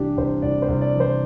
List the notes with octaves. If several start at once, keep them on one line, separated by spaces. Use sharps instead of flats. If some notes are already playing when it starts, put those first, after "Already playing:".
Already playing: C2 E3 D4 G4
C2 C5
C2 D5
C5
C2
D5
E3
C5